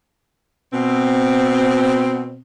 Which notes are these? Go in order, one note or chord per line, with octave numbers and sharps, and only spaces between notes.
B2 C4